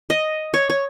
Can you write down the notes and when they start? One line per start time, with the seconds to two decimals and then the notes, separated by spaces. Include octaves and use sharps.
0.10 D#5
0.54 C#5
0.70 C#5